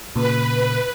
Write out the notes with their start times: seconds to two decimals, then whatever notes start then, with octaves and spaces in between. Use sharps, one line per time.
0.16 A#2 C#3 B4